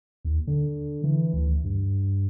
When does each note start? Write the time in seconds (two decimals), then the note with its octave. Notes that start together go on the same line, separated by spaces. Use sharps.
0.25 D#2
0.47 D3
1.04 E3
1.33 D2
1.64 G2